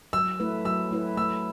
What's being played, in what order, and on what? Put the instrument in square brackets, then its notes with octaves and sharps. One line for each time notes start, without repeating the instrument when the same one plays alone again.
[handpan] F#3 [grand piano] E6
[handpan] A3 E4 B4
[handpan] F#3 [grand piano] E6
[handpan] A3 E4 B4
[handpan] A3 [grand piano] E6